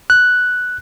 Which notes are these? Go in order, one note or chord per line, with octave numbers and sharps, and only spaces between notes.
F#6